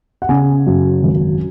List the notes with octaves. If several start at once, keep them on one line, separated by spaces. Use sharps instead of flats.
F#5
C#3 G#5
F#2
G#1